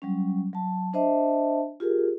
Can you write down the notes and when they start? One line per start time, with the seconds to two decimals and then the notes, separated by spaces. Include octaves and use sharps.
0.02 F#3 G3 C#4
0.53 F#3 A5
0.93 D4 C5 D#5 E5 A5
1.80 F4 G4 G#4 A#4